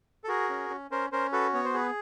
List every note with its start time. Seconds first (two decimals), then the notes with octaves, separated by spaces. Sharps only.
0.24 A4
0.28 F#4 G#4 A#4
0.49 C#4
0.70 C#4
0.91 C#4 A#4 C5
1.12 C#4 A#4 C5
1.32 F#4 A4 B4
1.54 B3 C#5
1.65 C5
1.74 G#4 B4